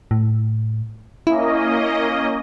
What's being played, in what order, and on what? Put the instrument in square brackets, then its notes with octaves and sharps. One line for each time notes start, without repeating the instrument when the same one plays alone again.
[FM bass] A2
[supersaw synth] A#3 C#4 D#5 [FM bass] E4